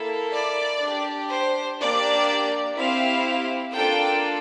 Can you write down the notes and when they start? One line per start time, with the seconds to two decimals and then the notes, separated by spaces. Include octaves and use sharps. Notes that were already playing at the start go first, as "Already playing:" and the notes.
Already playing: A#3 E4 A4
0.35 D5
0.82 D4 G4
1.32 C5
1.80 A#3 D4 G4 D5
2.77 C4 E4 G4 F5
3.74 A#3 D4 F4 A4 G5